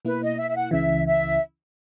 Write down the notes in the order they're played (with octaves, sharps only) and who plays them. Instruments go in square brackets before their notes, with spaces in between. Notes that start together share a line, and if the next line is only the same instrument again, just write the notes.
[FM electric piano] B2 A#3 E4 [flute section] B4
[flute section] D#5
E5
E5
F#5
[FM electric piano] C#2 C#3 E3 [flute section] E5
[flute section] E5